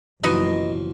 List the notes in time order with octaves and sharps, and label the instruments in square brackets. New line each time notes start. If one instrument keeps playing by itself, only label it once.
[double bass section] F#1 [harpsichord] B2 E3 F3 [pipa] D#4 B4 D#5